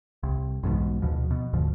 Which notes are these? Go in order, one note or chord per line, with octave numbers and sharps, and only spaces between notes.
C2
B1 E2 G#2 B2
D2 B2 F3
B2
D2 G#2 D3 F3